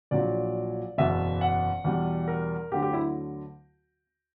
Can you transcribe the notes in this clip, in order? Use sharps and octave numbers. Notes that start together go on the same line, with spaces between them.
A#1 A#2 F#3 D5
F#1 E2 B2 E5
F#5
E2 B2 G3
A#4
D2 D3 F#3 G4
G4
E4